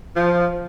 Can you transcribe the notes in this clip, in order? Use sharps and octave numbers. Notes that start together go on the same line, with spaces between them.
F3